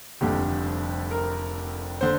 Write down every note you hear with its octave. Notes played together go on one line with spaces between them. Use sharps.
F1 F2 D3 G3 G4
A#4
D3 C5